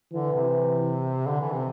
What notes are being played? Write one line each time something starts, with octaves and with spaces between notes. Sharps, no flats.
D3 E3
C3
D3
E3
C3